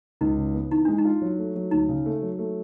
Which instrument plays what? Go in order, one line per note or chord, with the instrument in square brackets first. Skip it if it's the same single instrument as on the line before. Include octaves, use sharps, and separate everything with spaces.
[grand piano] C#2 [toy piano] D#4
[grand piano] C#3
B3
[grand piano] E3 [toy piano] D#4
[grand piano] G#3 [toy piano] D4
[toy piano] D#4
[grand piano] F4
F#3
A3
F#3
[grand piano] D2 [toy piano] D#4
[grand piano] C#3
A3
F#3
A3